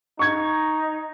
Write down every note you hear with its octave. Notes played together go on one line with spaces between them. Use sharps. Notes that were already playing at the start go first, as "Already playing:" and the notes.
D#4 C#6 G#6